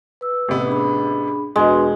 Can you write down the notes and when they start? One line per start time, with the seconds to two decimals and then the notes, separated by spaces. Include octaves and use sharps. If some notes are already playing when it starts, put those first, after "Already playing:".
0.21 B4 E6
0.48 A1 C3 B3
0.67 D4 G#4 B5
1.56 E1 G#3 D4 F#4 B4